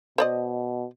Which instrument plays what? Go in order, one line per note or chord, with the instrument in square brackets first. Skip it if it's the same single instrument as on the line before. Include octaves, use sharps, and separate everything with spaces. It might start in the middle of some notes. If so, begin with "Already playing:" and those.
[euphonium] B2 [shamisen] C5 D5 D#5